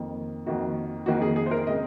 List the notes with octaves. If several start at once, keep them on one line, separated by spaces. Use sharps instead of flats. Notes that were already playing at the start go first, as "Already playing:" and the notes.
Already playing: F2 D#3 A#3
F2 D#3 A#3 F#4
F2 D#3 A#3 F#4
G#4
G#4
C5
A#4
C#3 G#3 C4 D#5